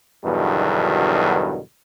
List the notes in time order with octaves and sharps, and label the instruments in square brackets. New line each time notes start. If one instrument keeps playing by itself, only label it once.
[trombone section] E2 G2 B2 D3 D#3 F#3